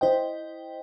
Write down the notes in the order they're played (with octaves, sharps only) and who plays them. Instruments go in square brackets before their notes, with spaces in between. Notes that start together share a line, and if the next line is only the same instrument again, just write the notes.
[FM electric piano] E4 C5 D#5 G5